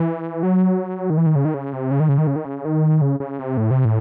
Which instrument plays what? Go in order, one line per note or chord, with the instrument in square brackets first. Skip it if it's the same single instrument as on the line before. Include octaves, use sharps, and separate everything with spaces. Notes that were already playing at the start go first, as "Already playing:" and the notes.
Already playing: [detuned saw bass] E3
F#3
D#3
E3
D#3
C#3
D#3
C#3
C3
C#3
D#3
C#3
D#3
C#3
D#3
C#3
D#3
C#3
C#3
C3
A2
C3
A2